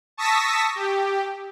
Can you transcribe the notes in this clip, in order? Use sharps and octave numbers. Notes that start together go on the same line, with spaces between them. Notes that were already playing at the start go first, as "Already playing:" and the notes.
A5 C#6 D#6 E6 A#6 B6
G4